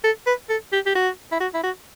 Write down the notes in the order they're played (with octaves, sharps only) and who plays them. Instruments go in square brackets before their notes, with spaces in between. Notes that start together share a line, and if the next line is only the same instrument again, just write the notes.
[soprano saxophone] A4
B4
A4
G4
G4
F#4
E4
F#4
E4
F#4